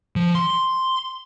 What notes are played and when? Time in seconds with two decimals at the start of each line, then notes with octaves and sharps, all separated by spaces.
0.16 F3
0.35 C6